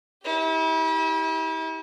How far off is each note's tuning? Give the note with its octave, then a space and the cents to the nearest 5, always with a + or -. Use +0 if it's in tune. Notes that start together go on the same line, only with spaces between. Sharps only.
E4 -40 G4 +0